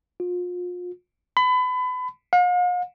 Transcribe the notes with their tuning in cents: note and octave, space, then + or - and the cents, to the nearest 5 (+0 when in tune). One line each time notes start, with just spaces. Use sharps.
F4 +35
B5 +30
F5 +45